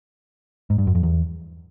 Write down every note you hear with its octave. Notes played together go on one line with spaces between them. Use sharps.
G#2
G2
F#2
F2
E2